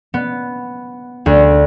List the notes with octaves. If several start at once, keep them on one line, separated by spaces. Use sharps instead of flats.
B3
D2